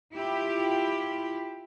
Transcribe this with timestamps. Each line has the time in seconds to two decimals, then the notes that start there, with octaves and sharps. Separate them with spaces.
0.14 E4 F4 G4